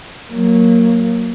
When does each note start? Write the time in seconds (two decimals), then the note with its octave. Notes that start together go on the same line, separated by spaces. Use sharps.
0.29 F#3 A#3